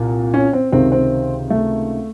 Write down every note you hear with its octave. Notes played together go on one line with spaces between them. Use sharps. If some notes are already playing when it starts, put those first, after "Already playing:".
Already playing: C2 A#2
C#4
C4
C#2 C3 D#3 C4
C4
A3